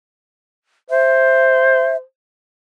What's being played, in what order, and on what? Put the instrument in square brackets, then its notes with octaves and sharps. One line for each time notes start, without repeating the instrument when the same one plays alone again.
[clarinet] C5 [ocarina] E5